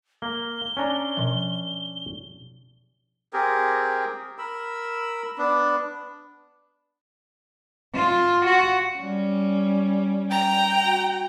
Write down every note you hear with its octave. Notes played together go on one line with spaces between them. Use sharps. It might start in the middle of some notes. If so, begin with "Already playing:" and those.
A#3 G7
C#4 D4 A#5
B2 F3
C4 G4 G#4 A#4
A#4 B5 E6
B3 D4
F4
F#4
G3 C#4
G5 A#5
F#4